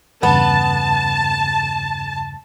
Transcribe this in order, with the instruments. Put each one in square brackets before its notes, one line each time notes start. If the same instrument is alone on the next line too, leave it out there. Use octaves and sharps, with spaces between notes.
[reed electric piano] E2 G2 C#3 [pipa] B3 [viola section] A5